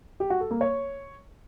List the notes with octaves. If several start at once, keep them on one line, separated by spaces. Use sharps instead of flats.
G4
F#4
A4
A#3
C#5